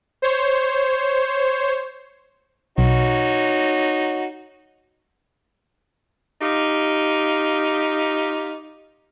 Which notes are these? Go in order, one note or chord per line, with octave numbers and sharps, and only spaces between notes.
C5 C#5
B1 D#4 F#4 C#5
D#4 F4 G4